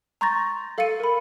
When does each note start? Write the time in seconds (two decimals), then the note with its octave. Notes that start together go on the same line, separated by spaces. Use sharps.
0.21 A#5 C6 C#6 G6 A6 A#6
0.78 A4 F5 E6 A6 C#7 D#7
1.00 A#4 B5